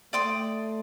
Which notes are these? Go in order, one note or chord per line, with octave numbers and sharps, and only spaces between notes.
A3 D5 G5 C6 D#6